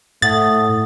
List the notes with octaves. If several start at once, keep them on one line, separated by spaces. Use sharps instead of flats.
A2 A3 F#5 D#6 A6